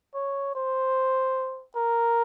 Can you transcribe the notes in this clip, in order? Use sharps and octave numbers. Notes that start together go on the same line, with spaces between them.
C#5
C5
A#4